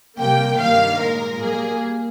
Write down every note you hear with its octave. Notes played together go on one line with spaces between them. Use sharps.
C3 G3 A#3 G5
G2 D#3 G3 A#3 F5
A#2 G#3 A#4
A#2 G3 A#3 G#4